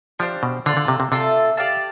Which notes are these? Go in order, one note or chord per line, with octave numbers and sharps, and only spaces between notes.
F3 D4 G4 C5 F5
B2
D3 D4 F4 A4 D5
D3
C3
C3
C3 A3 D4 F4 A4
G4 D5 F5 A5